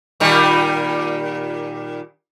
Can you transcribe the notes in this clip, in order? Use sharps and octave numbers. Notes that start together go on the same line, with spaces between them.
A#2 D#3 G3